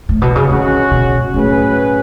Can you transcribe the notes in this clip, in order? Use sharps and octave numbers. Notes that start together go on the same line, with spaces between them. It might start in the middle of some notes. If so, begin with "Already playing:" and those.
A2
B2
C#3
D3 G#3 C#4 F#4
B2
A2 F#3 C#4 G#4 B4